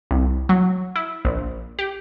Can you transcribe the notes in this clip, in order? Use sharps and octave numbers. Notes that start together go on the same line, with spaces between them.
C2
F#3
E4
A#1
G4